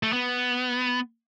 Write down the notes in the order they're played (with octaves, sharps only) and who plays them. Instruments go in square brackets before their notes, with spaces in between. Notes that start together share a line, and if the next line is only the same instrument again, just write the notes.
[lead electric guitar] A3
B3